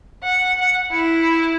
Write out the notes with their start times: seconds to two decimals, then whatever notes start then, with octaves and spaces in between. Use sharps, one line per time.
0.23 F#5
0.91 E4